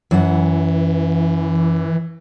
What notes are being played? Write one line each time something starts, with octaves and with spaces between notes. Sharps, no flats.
F#2 E3 F#5